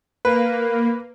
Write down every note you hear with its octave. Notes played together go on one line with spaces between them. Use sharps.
A#3 B4